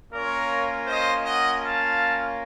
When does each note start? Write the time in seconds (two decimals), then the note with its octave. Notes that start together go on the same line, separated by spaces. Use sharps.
0.12 A#3 C#4 F4 A#4 C#5
0.87 C5 D#5
1.24 D#5 F#5
1.61 F5 A5